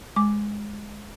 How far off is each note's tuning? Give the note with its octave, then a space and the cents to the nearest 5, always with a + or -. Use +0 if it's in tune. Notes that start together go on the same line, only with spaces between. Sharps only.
G#3 +0 D6 +0